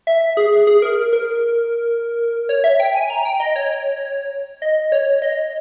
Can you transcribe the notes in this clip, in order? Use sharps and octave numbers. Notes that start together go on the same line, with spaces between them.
E5
G#4
G#4
A#4
A#4
C#5
E5
G5
G#5
A#5
G5
D#5
C#5
D#5
C#5
D#5